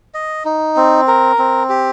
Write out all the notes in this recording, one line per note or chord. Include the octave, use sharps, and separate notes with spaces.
D#5
D#4
C4
A#4
C4
G4